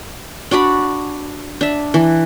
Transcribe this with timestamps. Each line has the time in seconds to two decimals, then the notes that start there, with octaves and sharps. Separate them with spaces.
0.51 D4 F#4 D5 B5
1.61 D4 E5
1.94 E3